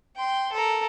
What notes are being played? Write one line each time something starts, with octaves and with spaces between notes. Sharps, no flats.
G5 C6
A4 A#4